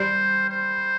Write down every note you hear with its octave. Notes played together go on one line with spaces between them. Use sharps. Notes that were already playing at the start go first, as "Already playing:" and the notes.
Already playing: G3 C5
C5